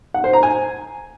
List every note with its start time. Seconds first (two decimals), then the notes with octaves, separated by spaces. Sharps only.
0.14 F#5
0.24 C5
0.33 A#5
0.43 G#5